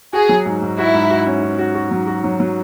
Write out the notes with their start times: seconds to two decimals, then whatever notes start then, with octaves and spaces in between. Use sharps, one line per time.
0.13 F#4 G#4
0.29 F#3
0.46 G#2
0.62 G#2
0.78 E4 F#4
0.94 G#2
1.10 F#4
1.27 C#4
1.43 C#4
1.59 F#4
1.75 F#4
1.91 F#3
2.07 F#4
2.24 F#3
2.40 F#3